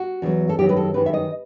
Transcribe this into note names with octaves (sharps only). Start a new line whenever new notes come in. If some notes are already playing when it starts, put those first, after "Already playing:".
Already playing: F#4
E2 D#3 F#3
A4
F#2 D#3 F#3 G4
B4
A4
F#2 D#3 F#3 B4
E5
D#5